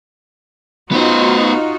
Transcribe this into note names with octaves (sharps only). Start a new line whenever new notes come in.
B3 D#4 F4 F#4 C5